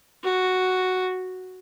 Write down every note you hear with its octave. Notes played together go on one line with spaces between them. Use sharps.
F#4